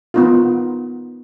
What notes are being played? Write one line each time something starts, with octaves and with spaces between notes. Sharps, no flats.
B3 D#4 F4